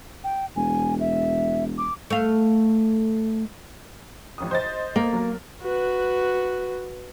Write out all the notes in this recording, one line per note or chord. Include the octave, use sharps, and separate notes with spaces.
G5
E1 G#5
E5
D6
A3 F5
A1 F2 D#6
C5 D#5 A6
A#3
F#3 A#4
F#4 B4